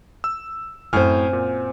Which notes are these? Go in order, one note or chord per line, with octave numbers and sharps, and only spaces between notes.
E6
F#2 A2 C4 C5 F#5 G#5 F6
A#2